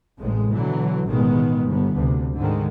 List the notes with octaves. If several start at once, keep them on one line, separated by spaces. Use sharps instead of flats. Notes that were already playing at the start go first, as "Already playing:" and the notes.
A1 A2 C3 G#3
B2 D3 E3 F#3
A1 B2 D#3 G#3 B3
G1 B3
D2 C3
G#2 D3 D#3 G#3